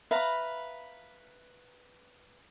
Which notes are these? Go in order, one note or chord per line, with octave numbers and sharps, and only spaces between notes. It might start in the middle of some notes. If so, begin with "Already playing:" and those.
B4 E5 F5 A#5 B5